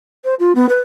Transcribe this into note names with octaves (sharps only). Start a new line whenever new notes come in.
C5
F4
B3
B4